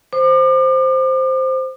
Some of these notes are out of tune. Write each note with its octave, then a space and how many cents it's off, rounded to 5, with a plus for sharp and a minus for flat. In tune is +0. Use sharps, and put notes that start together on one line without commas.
C5 +0 D6 +40